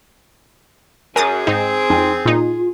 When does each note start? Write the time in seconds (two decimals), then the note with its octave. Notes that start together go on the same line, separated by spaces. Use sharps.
1.16 F#2 G#4 A#4 G#5 D#6 A6
1.47 G#2 C4 D#4
1.90 F2 D#4 G5 G#5
2.25 A#2 D#4 F4